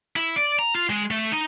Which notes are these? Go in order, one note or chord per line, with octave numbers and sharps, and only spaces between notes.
E4
D5
A#5
F4
G#3
A3
D#4